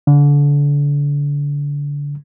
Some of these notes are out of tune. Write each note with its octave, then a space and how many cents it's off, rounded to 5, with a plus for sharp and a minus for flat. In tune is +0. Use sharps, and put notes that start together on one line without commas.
D3 -30